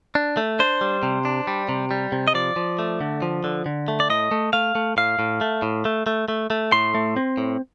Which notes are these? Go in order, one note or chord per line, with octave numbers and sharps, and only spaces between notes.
D4
A3
D4 C5
G3
C3
D4
G3
C3
G3
C3
D#5
F3 D5
F3
A3
D3
F3
D3
D3
A3
D5
A2 D#5
A3
A3 F5
A3
A2 F5
A2
A3
A2
A3
A3
A3
A3
A2 C6
A3
C4
A2